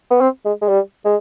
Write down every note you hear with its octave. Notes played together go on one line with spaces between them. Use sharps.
B3
C4
G#3
G#3
G3
G#3